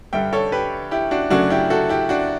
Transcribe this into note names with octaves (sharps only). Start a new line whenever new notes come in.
G2 D3 G3 E5 G5
A4 C#5
G4 B4
E4 G4
D4 F#4
F#2 C#3 F#3 A3 D4 F#4
E4 G4
F#4 A4
E4 G4
D4 F#4